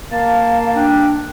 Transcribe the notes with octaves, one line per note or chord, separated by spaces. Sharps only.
A#3 F5 A5
D4 G5